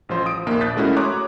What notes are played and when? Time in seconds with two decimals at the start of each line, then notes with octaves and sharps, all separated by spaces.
0.09 A1 F3 F4 C5
0.26 D#6 D7
0.46 A#1 D#2 A#3
0.61 D#6 F#6 G6 A6 B6
0.76 G#3 A3 C#4 E4 F#4 A#4
0.97 C#5 A#5 C6 D6 D#6 F#6